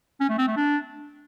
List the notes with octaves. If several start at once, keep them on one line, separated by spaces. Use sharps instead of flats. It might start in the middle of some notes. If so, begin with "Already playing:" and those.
C#4
A3
C4
A3
D4